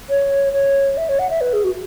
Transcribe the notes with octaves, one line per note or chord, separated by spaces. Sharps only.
C#5
C#5
E5
C#5
F#5
E5
B4
G#4
F#4